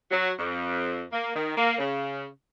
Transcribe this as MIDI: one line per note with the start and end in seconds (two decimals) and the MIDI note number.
0.11 0.30 54
0.38 1.02 41
1.12 1.31 58
1.35 1.53 51
1.56 1.75 58
1.78 2.25 49